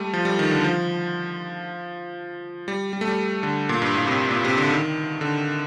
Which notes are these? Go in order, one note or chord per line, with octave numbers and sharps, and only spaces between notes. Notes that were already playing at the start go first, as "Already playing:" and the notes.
Already playing: G3 A3
F3
G3
D#3
D3
F3
G3
G3
A3
G3
D3
A#2
G2
A2
C3
A#2
C3
D3
D#3
D3